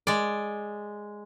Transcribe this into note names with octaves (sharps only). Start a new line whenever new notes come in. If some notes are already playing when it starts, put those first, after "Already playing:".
G#3 D5